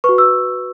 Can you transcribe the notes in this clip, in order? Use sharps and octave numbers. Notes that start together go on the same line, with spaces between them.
F#4 B4 C#6
E6